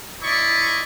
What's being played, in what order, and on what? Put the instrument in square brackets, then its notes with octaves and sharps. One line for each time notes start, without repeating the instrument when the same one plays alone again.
[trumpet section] E4 D5 D#5 B5 C#6